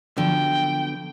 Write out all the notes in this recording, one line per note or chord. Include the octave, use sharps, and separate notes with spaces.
D3 F3 F#3 B3 G5